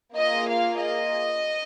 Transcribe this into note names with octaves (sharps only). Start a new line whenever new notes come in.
A#3 F4 G#4 D#5
F5
D#5